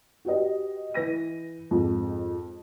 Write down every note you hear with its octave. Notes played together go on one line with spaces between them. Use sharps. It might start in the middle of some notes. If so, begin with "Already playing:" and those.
F#4 G4 B4 D#5
E3 B4 A#6 D#7
F2 G#2